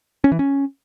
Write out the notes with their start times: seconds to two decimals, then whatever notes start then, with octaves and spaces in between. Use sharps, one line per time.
0.24 C#4
0.32 E3
0.39 C#4